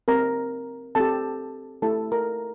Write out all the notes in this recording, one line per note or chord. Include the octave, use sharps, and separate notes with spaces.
C4 G4 A#4 A#5
C4 G4 A4 A5
A3 E4 G4 A4 A5
A#4 A#5